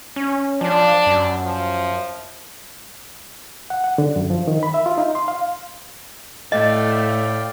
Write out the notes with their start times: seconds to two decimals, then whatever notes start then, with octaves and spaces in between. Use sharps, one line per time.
0.16 C#4
0.61 F3 D4
1.06 F#2
1.43 F3
3.70 F#5
3.84 F#5
3.98 D3
4.16 F#2
4.30 F3
4.48 D#3
4.63 B5
4.74 E5
4.86 F4
4.98 D#4
5.15 C6
5.28 F5
6.52 A2 A3 D5 D#5 F5 G5